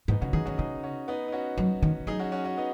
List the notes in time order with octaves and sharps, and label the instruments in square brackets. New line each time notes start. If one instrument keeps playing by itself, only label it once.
[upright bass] G#2 [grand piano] B3 D#4
[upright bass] C#3 [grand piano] C#4 F#4
[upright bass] D#3 [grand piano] D#4 G#4
[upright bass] D#3 [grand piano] C#4 F#4
[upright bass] C#3 [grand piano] D#4 G#4
[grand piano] C#4 F#4
B3 D#4
D#4
C#4 F#4
[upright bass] F#3
D#3
[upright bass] F#3 [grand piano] D#4 G#4
[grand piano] C#4 F#4
C#4 F#4
C#4 F#4
B3 D#4